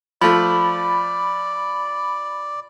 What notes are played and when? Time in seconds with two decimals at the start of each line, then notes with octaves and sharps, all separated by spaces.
0.21 F3 A3 D5 B5